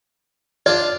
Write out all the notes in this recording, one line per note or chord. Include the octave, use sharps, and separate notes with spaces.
D4 F4 D5 F5